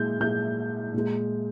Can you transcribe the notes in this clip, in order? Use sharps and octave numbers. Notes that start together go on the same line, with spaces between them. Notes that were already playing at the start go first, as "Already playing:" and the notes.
Already playing: A#2 G#3 G6
A#2 G#3 G6
A#2 G#3